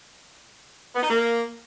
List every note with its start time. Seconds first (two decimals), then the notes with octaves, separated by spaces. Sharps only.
0.95 B3
1.02 D#4
1.09 A#3